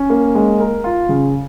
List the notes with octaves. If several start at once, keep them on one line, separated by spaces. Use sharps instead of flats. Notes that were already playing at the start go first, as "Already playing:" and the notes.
Already playing: C#4
A#3
G#3
A#4
F4
C#3